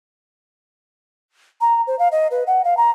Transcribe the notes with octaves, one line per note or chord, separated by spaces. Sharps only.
A#5
C5
F5
D#5
B4
F#5
F5
A#5